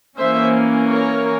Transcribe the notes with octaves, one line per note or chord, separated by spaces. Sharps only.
E3 A#3 C#4 C5 E5
A#4 C#5